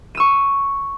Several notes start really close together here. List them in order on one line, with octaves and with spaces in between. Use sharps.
D#7 E6 C#6